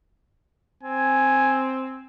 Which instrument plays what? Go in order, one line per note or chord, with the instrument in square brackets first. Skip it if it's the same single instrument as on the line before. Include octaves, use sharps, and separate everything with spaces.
[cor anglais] C4 [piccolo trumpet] G#5